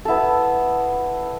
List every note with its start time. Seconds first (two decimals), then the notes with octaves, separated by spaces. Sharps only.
0.05 B3 E4 A4